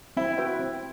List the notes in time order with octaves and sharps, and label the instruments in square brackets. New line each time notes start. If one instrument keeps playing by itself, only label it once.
[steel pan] C4 [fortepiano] E4
[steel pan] F#4 B4 E5 G5
C4